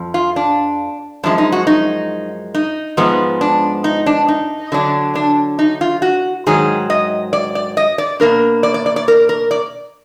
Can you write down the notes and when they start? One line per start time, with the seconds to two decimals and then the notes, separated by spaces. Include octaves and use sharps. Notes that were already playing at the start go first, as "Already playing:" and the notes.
Already playing: F2 F3
0.14 F4
0.36 D4
1.23 F#2 F3 G#3 D4
1.38 D#4
1.52 F#4
1.67 D#4
2.54 D#4
2.97 G#2 F3 G#3 B3
3.41 D4
3.84 D#4
4.06 D4
4.28 D#4
4.72 D3 F#3 D4
5.15 D4
5.59 D#4
5.81 F4
6.02 F#4
6.46 G#2 D#3 F#3 G#4
6.90 D#5
7.33 D5
7.55 D5
7.77 D#5
7.98 D5
8.20 B2 A#3 D4 A#4
8.63 D5
8.74 D5
8.86 D5
8.96 D5
9.08 A#4
9.29 A#4
9.51 D5